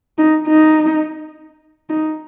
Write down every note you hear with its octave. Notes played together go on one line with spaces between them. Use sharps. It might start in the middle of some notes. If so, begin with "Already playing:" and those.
D#4
D#4
D#4